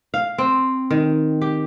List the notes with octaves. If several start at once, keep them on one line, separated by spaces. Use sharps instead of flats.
F5
C4
D#3
G4